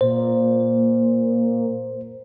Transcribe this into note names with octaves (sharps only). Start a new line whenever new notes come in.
A#2 C5